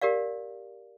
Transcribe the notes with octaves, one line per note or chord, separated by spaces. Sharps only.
G4 A#4 D5 F5